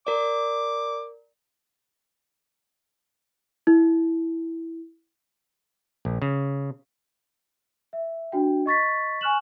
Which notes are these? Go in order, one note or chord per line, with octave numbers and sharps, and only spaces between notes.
A#4 D5 D6
E4
A#1
C#3
E5
D4 F#4 G5
D#5 C#6 A6 B6
G#5 C#6 F6 F#6 E7 F#7